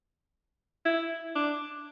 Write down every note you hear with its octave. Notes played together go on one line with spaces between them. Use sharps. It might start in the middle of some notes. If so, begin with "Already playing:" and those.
E4
D4